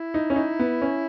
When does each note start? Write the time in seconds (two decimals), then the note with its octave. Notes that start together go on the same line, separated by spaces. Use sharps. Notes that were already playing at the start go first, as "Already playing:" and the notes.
Already playing: E4
0.14 D#4
0.30 C#4
0.36 D#4
0.59 B3
0.82 C#4